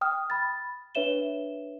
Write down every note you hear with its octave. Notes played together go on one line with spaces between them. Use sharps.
G5 D#6 F6
B5 A6
D4 B4 C#5 E5 E7 G7